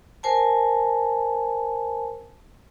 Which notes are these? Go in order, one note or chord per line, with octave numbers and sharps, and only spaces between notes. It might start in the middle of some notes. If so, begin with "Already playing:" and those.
A#4 C5 G#5 A5